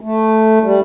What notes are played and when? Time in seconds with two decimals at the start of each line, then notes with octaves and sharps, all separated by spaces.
0.01 A3
0.63 G3